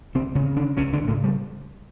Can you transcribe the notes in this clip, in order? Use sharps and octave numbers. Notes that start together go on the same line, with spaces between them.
C#2 C3 C4
C#3 C#4
C#3
D3 D4
C#2 C#3 C#4
D3 D4
A2 C#3 A3
G3